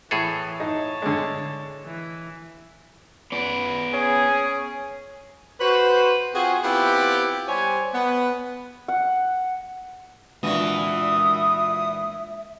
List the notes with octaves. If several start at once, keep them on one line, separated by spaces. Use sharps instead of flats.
A2 E3 G#4 A4
D#4 C#5 A5
D3 G#3
E3
B3 D5
C#4 G#4
F#4 B4 C5
C4 F4 F#4 G#4
B3 C4 E4 F4 G4
G3 C5 C#5 G#5
B3
F#5
A#2 E3 G#3 D4 F4 F#4 E5 D#6